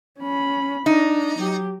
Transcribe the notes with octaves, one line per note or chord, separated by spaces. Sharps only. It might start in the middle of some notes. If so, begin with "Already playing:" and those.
C#4 B5
D4 D#4
F#3 G4